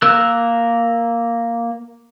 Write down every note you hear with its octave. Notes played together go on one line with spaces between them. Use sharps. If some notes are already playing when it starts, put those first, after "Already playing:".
A#3 A#4 E6 F#6